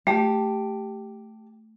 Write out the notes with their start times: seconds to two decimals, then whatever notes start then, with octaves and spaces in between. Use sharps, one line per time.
0.07 A3 G4 A5